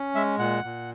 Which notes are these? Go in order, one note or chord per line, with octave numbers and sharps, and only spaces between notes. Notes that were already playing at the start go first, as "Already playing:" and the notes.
Already playing: C#4
G#3 E5
A#2 F#5
A#2